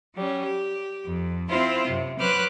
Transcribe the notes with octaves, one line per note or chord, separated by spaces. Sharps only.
F#3 G3 C#4
G4
F2
C4 E4 F4 C5
F#2 C3
F#3 B4 C5 D6 F6 F#6